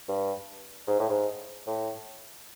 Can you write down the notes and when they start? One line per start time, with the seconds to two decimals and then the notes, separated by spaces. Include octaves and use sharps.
0.08 G2
0.87 G#2
0.99 A2
1.10 G#2
1.67 A2